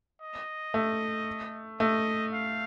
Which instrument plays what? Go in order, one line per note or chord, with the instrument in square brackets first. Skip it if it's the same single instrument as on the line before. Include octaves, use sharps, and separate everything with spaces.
[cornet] D#5
[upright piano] A3
[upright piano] A3 [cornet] D#5
[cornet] F5